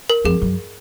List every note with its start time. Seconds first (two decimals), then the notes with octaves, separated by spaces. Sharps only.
0.10 A#4
0.25 F2 G#4
0.42 F#2